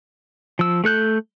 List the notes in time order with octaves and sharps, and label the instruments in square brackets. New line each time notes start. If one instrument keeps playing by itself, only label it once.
[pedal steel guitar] F3 E6
A3 A4 F#6 G6